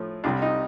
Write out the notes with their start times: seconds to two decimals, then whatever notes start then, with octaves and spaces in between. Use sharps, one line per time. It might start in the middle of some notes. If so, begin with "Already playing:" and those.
Already playing: A2 F3 A3
0.24 C2 C3 G3 D4
0.42 D#4